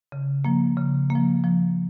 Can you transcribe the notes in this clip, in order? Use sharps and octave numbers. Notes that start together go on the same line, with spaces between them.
C#3
F3 A#3
C#3
A#3
F3
F3